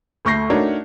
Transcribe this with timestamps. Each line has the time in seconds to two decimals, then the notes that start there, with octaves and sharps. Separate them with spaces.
0.25 D2 A3 C#6 G6 A#6 C7
0.50 A3 D4 D#4 F#4 A#4 C#5